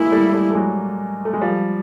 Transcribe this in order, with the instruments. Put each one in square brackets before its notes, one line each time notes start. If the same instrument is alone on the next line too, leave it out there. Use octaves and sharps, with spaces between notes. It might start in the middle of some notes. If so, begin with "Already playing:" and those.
Already playing: [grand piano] G#3 A#3 [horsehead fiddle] E4
[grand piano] G3 A3
G3 A3
A3
F#3 G#3
A3
G#3
F3 G3